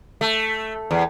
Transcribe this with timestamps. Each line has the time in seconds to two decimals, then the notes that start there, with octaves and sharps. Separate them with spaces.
0.21 A3
0.91 E2